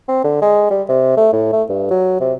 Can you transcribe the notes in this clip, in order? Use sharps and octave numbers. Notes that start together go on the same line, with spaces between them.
C4
D3
G#3
G3
C3
A3
A2
A3
G2
F#3
C3